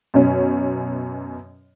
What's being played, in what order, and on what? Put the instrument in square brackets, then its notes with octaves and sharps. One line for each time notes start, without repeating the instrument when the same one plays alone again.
[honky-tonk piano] F#2 B2 C#4